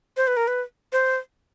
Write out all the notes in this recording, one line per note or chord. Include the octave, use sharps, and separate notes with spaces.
C5
B4
A#4
B4
C5